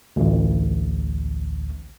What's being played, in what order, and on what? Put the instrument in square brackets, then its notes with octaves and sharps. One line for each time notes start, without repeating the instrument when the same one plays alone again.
[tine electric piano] A1 D2